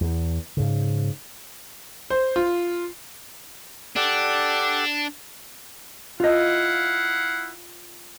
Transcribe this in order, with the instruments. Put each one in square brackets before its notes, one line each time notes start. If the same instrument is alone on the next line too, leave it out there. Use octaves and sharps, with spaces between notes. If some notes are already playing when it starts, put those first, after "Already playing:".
[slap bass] E2
G#2 C#3
[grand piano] C5
F4
[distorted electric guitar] D4 [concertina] G4 A4 F#5
[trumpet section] E4 F5 F#5 [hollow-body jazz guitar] F4 D#5